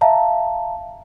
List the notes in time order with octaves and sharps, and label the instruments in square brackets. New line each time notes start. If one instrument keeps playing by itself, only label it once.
[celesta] E5 F5 A5 A#5